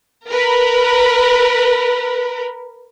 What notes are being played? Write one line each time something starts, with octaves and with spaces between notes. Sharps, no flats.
A#4 B4